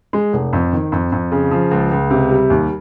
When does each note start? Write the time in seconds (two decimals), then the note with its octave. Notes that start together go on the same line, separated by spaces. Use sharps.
0.13 G#3
0.33 F1
0.53 F2
0.73 D#3
0.92 F2
1.12 F2
1.32 C#3
1.51 F3
1.71 C#2
1.91 C#2
2.10 C3
2.30 G3
2.50 D#2